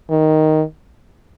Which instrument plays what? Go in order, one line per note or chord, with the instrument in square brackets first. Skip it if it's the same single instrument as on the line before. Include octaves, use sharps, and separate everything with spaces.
[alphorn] D#3